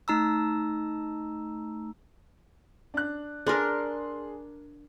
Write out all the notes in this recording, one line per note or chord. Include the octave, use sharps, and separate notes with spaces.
A3 D#4 A#5 E6
D4 F#6
D4 G#4 A#4 C6